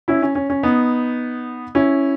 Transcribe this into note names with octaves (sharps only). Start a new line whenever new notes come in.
C#4 E4
C#4
C#4
C#4
B3 D#4
C#4 E4